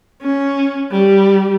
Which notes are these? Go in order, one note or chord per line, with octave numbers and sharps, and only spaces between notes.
C#4
G3